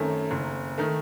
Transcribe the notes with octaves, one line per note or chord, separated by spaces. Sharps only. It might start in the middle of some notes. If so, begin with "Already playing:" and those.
Already playing: F#2 D#3 A3 C4
F#1
D#3 A3